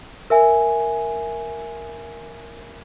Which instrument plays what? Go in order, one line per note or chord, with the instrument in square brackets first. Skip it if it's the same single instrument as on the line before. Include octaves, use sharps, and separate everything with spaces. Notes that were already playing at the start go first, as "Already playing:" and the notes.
[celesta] A#4 E5 G#5